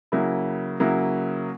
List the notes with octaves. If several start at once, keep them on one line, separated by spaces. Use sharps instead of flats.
C#3 F#3 A#3 E4
C#3 F#3 A#3 E4